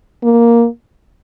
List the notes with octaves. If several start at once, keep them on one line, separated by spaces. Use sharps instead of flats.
A#3